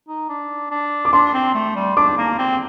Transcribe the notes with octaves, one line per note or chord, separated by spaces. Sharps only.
D#4
D4
D4
D6
D4 C6
C4
A3
G3
D4 D6
A#3
C4